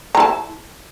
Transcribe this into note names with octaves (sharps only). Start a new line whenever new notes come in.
E4 A5 A#5